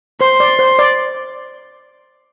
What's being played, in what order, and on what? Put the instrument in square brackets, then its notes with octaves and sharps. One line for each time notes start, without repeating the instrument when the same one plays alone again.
[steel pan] C5 [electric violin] C6
[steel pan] D5
C5
D5